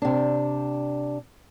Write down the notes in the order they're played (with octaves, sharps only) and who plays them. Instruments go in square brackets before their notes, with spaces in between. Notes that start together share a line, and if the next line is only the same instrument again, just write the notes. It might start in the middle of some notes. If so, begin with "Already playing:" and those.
[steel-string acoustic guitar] C3 D4